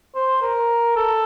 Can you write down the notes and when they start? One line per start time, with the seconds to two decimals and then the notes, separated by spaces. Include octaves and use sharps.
0.15 C5
0.42 A#4
0.96 A4